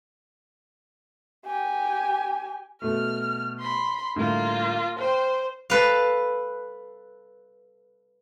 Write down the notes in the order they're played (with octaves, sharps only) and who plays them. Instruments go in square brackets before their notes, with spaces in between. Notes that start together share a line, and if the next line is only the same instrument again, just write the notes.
[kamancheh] G4 G#5
[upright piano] B2 A3 [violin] F6
[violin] B5 C6
[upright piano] A2 D3 G3 [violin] A#3 F4
[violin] C5 [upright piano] G5 C6 F6
[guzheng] A4 B4 F5